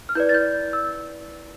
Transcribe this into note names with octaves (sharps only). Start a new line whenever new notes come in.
F6
E4 B4 D5 G6
A6
G6
E6